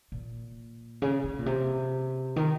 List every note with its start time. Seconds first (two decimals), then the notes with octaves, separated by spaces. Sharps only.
0.12 A#2
1.02 C#3
1.24 C#3
1.39 A#2
1.46 C3
2.36 D#3